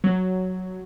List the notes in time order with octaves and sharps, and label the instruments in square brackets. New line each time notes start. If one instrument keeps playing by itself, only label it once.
[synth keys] F#3